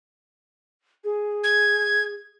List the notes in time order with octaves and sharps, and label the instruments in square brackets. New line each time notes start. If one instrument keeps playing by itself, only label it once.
[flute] G#4
[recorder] G#6